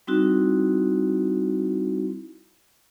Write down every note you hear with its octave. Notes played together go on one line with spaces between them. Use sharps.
G3 C4 D#4 E4 F#4